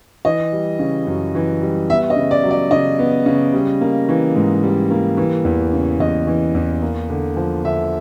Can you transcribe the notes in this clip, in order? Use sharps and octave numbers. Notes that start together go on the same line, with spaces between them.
E3 D#5
G3
C#3
F#2
E3
G3
B3 E5
D#5
C#3
D5
F#3
D5
C#3 D#5
B3
C#3
G3
A#3
E3
G#2
G3
A#3
E3
E2
C#3
E2 D#5
E3
E2
A#3
D3
F3
D3 E5